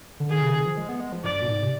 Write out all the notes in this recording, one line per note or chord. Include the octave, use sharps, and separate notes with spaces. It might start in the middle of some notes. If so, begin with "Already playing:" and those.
D3
D#3 G#4
C3
D#3
F3
G#3
B3
G#3
F3
G2 D5
B2
G#2
C3